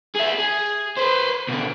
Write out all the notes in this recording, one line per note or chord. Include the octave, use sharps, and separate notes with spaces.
G#4 E5
G#4
B4 C5
B2 D3